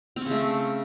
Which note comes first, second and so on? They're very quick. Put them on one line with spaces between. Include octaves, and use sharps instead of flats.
C4 C#4 C#3 A3